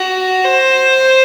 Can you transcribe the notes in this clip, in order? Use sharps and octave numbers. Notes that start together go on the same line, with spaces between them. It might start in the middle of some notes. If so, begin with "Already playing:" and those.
Already playing: F#4
C5